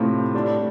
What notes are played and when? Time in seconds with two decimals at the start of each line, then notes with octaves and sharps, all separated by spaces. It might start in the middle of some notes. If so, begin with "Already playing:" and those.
Already playing: A2 C3 A3 C4 F4
0.34 D3 G3 D4